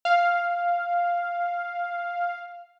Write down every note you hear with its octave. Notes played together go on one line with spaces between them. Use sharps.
F5